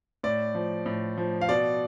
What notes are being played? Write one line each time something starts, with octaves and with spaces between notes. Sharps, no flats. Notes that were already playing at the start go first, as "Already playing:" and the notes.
A2 D5
F3
A2
F3
F5
B2 D5